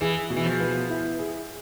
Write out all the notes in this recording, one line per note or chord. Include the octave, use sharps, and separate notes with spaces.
E3 G#4
B2
E3
F3
B3
E4
G#4